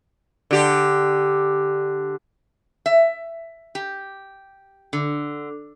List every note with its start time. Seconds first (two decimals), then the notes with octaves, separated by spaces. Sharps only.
0.51 D3 G4
2.86 E5
3.75 G4
4.93 D3